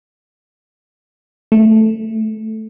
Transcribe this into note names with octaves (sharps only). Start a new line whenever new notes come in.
A3